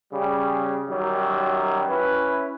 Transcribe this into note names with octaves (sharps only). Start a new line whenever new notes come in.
C#3 G3
F#2 D#3 F#3 G3
C#4 E4 B4